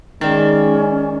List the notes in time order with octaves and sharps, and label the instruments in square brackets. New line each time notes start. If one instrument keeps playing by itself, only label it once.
[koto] D#3 [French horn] G#3 [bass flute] C#4 [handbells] D#4 D5